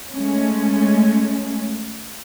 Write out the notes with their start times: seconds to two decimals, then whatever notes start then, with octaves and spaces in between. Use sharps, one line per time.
0.12 G#3 A3 C#4